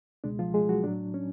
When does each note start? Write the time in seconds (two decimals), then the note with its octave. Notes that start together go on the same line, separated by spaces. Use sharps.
0.24 C#2 B2 G#3 D4
0.39 F3 F4
0.54 G#3 G#4
0.69 F#3 F#4
0.84 A2 F#3 D4
1.14 C#4